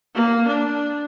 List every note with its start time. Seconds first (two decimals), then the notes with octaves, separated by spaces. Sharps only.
0.15 A#3
0.48 D4